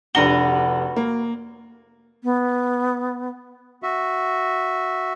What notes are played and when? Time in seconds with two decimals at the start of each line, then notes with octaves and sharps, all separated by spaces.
0.15 F1 D4 F#4 A#4 B4 G7
0.96 A#3
2.24 B3
3.83 F#4 E5